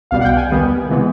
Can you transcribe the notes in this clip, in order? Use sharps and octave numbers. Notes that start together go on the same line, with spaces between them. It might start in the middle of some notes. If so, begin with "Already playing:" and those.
C2 B2 G3 F5
F#5
G5
G#5
D#2 D#3 G3 B3
C3 E3 G#3 B3